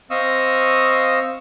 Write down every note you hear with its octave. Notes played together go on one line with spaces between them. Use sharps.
C4 D#5 F5 C#6 D#6 E6